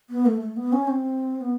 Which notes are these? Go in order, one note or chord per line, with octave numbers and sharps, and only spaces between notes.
B3
A3
A3
B3
C#4
C4
B3